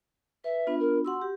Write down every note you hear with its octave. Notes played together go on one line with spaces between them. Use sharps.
B4 E5
B3 D4 F4
A#4
F#4 F#5 C6 E6
G4